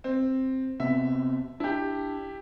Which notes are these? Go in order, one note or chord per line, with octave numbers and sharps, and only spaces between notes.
C4
C3 B3 C4 E5
D4 E4 G4